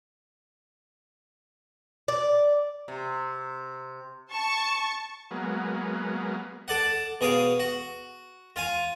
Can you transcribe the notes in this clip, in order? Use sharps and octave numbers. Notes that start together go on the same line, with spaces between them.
D5
C3
A5 C#6
F#3 G#3 A#3 B3
A4 D5 F#5
B2 G#4 C#5 F5
F#4
F4 F5 G#5